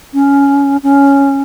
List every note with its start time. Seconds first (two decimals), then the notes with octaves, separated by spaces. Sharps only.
0.14 C#4
0.83 C#4